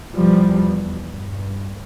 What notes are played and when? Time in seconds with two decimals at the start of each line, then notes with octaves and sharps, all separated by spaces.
0.15 E2 B2 F3 G3
1.10 G2